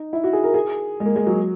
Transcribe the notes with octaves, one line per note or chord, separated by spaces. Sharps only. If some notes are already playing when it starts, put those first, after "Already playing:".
Already playing: D#4
E4
F#4
G#4
A#4
G#4
G#3
A#3
G#3
F#3